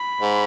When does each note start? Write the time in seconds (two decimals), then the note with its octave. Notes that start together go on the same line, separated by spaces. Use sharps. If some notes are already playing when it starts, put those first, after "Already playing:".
Already playing: B5
0.21 G#2